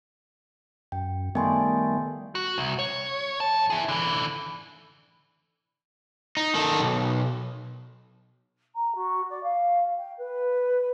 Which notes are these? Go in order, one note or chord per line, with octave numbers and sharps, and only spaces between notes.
F#2 G5
D#3 G3 A3 B3 G#5 C6
F#4
C2
C#5
F2 A5
E4 G#4
D3 E3
D#4
D#3 A4
B1
A#5
F#4
D5
F5
G5
B4